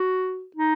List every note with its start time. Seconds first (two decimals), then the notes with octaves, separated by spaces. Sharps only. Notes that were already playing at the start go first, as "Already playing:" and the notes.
Already playing: F#4
0.56 D#4